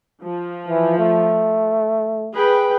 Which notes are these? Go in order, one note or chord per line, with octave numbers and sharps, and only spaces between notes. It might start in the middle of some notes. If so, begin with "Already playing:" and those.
F3
E3
A3
G#4 B4 G5